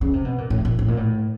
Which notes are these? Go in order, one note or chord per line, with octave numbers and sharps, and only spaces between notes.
C#3
C3
B2
A#2
A2
A#2
A2
A#2
A2